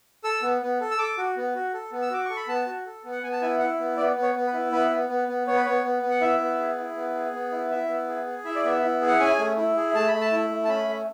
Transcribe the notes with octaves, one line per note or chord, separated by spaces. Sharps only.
A4 E6
B3
B3
A4
E6
A4 D6
F#4
B3
F#4
A4
B3
E6
F#4 D6
A4 C#6
B5
B3 A5
F#4
A4
B3
F#5
B3 G#5
A5
E4 G#5
E4 F#5
B3
B3 D5
B3
C#5
B3
B4
E4
B3 B4
B3
B3
B3
B3 C#5
B4
B3 C#5
B3
B3
F#5
E4 E5
B3
G#4
E4
B3
G#4
B3
E4
E4 E5
B3
G#4
G#4
E4 E5
D5
B3 E5
E4
G#4
F#5
C#4 G#5
A3
E4
G#4
A3 A5
A3 B5
A5
E4
A3
A5
C#4 B5
A3